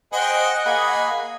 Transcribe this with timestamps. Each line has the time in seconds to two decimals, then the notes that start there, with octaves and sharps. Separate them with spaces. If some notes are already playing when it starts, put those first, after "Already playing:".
0.13 G#4 C5 D#5 F#5 G5
0.66 A#3 G#4 G#5 B5